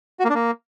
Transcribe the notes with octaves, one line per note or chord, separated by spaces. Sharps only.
F#4
A#3
D4
A#3